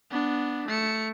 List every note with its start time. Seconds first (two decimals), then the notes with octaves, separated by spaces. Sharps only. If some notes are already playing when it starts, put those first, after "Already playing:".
0.11 B3 D4
0.68 A3 C#7